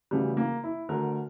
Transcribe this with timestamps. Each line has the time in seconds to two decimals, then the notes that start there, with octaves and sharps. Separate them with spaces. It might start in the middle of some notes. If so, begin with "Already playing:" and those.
0.11 D2 C#3 E3 G3
0.37 A#3
0.64 E4
0.89 D2 D3 A#4